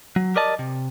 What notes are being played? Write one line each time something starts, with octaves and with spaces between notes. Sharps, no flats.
F#3
G4 A#4 D5 D#5 A5
C3